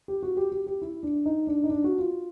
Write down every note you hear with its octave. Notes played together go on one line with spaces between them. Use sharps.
G4
F#4
G4
G4
G4
E4
D4
D#4
D4
D#4
D4
F#4
F4